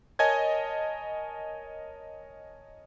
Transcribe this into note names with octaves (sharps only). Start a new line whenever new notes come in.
A#4 C#5 D#5 G#5 A5 G#6